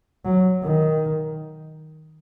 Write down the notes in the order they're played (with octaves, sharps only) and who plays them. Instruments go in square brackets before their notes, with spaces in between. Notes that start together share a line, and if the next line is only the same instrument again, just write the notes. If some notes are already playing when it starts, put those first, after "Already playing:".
[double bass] F#3
D#3